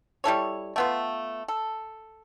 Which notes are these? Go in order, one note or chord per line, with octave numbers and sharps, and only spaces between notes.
G3 E4 A4 C#5
A3 B3 F4
A4